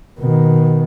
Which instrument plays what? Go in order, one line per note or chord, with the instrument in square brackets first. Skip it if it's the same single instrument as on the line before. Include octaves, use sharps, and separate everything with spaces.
[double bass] B2 D#3